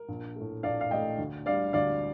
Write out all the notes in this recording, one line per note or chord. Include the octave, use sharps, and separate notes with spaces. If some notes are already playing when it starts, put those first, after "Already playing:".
Already playing: A#4
A#1
A2 A3
A#1 D5 F5
F5
A2 A3 D#5 G5
D2
D3 G3 D5 F5
D2 D5 F5